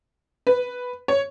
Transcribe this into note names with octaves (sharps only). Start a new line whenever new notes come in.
B4
C#5